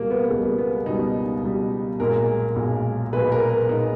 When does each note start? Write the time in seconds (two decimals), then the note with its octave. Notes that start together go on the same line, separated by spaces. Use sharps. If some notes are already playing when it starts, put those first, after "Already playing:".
Already playing: C#2 B2 G3 A#3
0.11 B3
0.30 C#2 B2 G3 A#3
0.59 B3
0.86 C#2 B2 G3 D#4
1.43 C#2 B2 G3
2.00 B1 A#2 G#3 A#4
2.56 B1 A#2 G#3
3.13 B1 A#2 G#3 B4
3.32 A#4
3.50 A#4
3.69 A#2 G#3 D#4